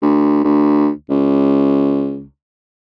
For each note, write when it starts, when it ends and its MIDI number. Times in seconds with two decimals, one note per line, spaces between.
0.02 0.43 38
0.44 0.89 38
1.10 2.24 37